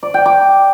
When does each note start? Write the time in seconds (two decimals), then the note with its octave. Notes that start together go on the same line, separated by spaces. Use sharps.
0.03 D5
0.14 G5
0.26 D6